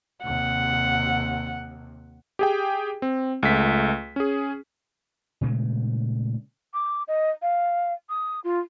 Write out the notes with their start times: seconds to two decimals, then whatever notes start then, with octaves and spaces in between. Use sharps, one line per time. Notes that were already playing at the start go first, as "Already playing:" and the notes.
0.24 D#2 C3 F#5
2.39 G4 G#4 G5
3.02 C4
3.43 C#2 A3 B6
4.16 C#4 G#4
5.41 A#2 C#3 G#3 A3
6.74 D6
7.08 D#5
7.42 F5
8.09 D#6
8.44 F4